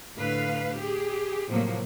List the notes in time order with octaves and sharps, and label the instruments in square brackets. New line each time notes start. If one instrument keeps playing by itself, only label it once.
[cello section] A2 D3 B4 F5
G4 G#4
A2 C3 F3 F#3 A#3